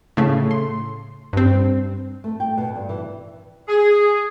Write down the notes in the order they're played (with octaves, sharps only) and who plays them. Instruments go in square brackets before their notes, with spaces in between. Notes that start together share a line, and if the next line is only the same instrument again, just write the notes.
[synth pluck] A2 C#3 A3
C6
G2 C4
[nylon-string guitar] A3
G5
B2
G2
E3
[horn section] G#4